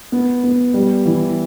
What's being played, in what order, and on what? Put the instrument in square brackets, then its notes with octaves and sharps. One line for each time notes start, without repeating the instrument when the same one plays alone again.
[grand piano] B3
B3
G3
E3